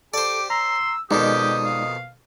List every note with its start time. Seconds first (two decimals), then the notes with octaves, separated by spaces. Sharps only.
0.14 G4 A4 C5 D5 D6
0.50 A#5 C6 E6
1.11 F2 B2 D#3 G#3 D#4 G4 D5 D#6
1.64 F5